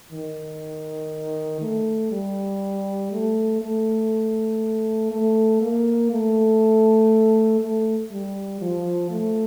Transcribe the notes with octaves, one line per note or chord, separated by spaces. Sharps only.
D#3
A3
G3
A3
A3
A3
A#3
A3
A3
G3
F3
A3